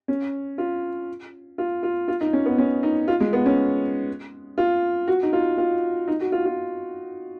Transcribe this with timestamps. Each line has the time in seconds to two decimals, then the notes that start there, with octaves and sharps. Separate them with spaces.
0.08 C#4
0.58 F4
1.58 F4
1.83 F4
2.08 F4
2.21 D#4
2.33 C#4
2.46 B3
2.58 C#4
2.83 D#4
3.08 F4
3.20 G#3
3.33 B3
3.46 C#4
4.58 F4
5.08 F#4
5.23 D#4
5.33 F4
5.58 F4
6.08 D#4
6.20 F#4
6.32 F4
6.45 F4